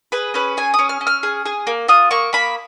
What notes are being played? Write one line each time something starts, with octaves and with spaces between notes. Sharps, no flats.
G#4 B4
C#4 B4
G#4 G#5
D#6
C#4
F6
C#4
F6
G#4
G#4
A#3
F4 D#6
A#3 C#6
A#3 B5